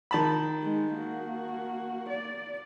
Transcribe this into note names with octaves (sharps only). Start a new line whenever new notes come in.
D#3 A5 B5
G#3 D#4
A#3 F#4
D5